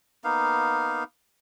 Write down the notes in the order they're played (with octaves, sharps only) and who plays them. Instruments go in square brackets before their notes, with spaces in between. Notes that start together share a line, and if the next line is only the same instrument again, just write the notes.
[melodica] A#3 B3 D#4 F5